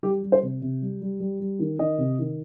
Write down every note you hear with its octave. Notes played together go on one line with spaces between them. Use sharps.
G3 G4
G3
C5
C3
C3
G3
G3
G3
G3
D#3
D#3 D#5
C3
D#3